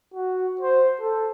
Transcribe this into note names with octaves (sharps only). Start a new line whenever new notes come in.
F#4
C5
A4